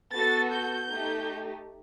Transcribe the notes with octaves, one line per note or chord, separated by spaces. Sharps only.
B3 F#4 A4 A6
G6
A3 D#4 G4